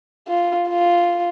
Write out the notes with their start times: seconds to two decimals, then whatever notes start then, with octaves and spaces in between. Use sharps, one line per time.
0.28 F4
0.68 F4